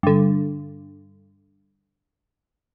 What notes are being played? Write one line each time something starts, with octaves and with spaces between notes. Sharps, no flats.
G2 D3